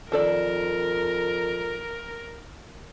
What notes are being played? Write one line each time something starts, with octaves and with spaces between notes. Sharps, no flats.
F2 D#3 A4 A#4 D5